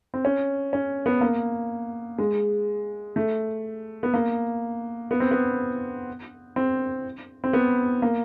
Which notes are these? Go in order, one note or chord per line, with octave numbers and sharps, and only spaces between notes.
C4
C#4
C#4
B3
A#3
G#3
A3
B3
A#3
B3
C4
B3
C4
C4
B3
A#3